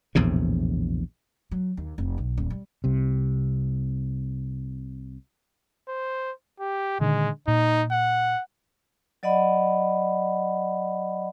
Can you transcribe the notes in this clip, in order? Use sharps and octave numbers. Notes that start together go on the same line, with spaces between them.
A#1 E2 A2 C3
F#3
D#2
F1
B1
D#1
G3
C2 C3
C5
G4
A#2 D3 D#3 G#3
A#2 D#4
F#5
F#3 D5 D#5 F#5 B5